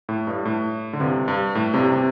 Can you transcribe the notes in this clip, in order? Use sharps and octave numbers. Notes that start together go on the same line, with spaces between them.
A2
G2
A2
D3
G2 C3
G2
A2
G2 C3
C3